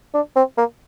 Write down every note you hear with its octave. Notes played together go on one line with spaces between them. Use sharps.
D4
C4
A#3